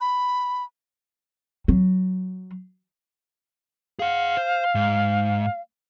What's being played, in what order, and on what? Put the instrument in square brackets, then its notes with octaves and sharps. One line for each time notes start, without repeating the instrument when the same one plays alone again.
[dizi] B5
[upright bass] F#3
[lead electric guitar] G#4 F#5 [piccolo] F5
[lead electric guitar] C5
G#2